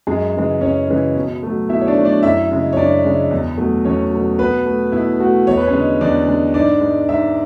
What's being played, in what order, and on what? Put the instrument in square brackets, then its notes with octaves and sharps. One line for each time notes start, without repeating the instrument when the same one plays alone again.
[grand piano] F#2 G#3 G#4
C#3 E3 G#3
F#2 C#4 C#5
C#3 E3 G#3
B2
F#3 A3
B2 E4 E5
C#5
D4 D5
F#3 A3
D4 D5
F#2 E4 E5
C#3 G#3
C#5
F#2 D4 D5
C#3 G#3
E2
B2 F#3 A3
E2 C#4 C#5
B2 F#3 A3
B2 B3 B4
A3
B2 E4
A3 F#4
E2 C#5
B4
C#4 C#5
D3 G#3
E2 D4 D5
D3 G#3
G#2 D4 D5
G#3
G#2 E5